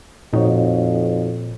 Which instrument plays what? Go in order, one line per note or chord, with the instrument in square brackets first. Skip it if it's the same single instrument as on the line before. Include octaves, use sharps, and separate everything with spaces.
[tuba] F2 [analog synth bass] A#2 [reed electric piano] D#4 F#4 C#5